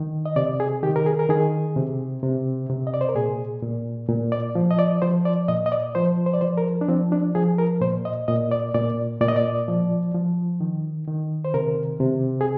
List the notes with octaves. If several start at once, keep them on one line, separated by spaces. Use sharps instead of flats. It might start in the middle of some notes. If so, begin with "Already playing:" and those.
Already playing: D#3
D#5
C3 D5
G#4
D#3 G4
A#4
G#4
A#4
D#3 G#4
C3
C3
C3
D#5
D5
C5
A#4
A#2 G#4
A#2
A#2
D5
F3
D#5
D5
F3 C5
D5
A#2 D#5
D#5
D5
F3 C5
C5
D5
F3 C5
A#4
D4
F3 C4
D4
F3 G#4
A#4
A#2 C5
D#5
A#2 D#5
D5
A#2 D5
A#2 D5
D#5
D5
F3
F3
D#3
D#3
C5
C3 A#4
C3
G#4